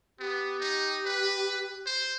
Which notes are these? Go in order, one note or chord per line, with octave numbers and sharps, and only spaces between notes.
B3 G4
D#4
B4
C5